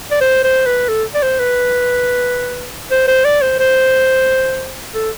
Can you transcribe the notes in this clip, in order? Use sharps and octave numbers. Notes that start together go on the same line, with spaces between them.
D5
C5
C5
B4
A4
D5
C5
B4
C5
C5
D5
C5
C5
A4